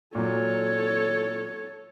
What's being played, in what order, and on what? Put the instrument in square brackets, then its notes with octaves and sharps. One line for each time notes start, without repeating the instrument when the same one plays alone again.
[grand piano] A#2 F#3 [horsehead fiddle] A4 C#5